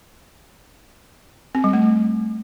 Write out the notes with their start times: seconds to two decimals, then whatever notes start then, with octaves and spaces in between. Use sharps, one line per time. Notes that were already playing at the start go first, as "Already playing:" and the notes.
1.55 C4
1.64 G3
1.73 A3